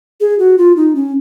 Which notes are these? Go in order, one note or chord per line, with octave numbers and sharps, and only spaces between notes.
G#4
F#4
F4
D#4
C#4